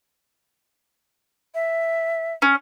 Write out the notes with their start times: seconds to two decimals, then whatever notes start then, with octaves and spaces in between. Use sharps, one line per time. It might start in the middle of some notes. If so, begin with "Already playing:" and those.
1.55 E5
2.42 C#4